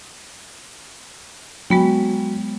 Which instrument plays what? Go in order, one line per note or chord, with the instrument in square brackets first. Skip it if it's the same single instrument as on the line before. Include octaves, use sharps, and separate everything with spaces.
[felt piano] F#3 [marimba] G#3 B3 G5